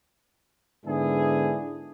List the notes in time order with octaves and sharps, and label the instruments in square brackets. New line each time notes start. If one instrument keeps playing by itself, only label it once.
[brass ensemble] G#2 D3 B3 D4 E4 G#4